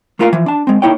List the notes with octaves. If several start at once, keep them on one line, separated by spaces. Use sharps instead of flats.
A3 A#3 F4 A#4 B4 F5
E3 F3
D4 A5
G#3 C4
A#3 D#4 E4 C#5 G5